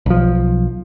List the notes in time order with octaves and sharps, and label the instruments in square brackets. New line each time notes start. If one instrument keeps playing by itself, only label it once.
[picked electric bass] B1 F3